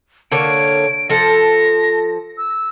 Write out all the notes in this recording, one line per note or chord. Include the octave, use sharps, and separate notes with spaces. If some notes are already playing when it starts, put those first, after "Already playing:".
D3 A#3 C#5 D7
F3 A4 A#6
E6